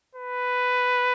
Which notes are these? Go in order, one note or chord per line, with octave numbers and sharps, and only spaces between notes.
B4